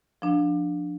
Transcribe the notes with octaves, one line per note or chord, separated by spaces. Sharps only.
F3 D4